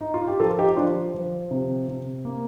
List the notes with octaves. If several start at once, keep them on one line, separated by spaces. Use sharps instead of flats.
D#4
F4
G4
F3 F4 A4
D#4 G4
F3 D4 F4
F3
C3
C3
A#3